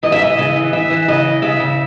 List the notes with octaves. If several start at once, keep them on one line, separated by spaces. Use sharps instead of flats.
E3 D#5
E5
C#3 D#5
C#3 D#5
E3
E3 E5
E3
C#3 D#5
E3
C#3 E5
C#3